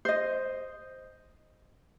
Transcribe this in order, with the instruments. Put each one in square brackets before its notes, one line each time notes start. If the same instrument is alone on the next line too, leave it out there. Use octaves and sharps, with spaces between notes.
[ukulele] C5 D#5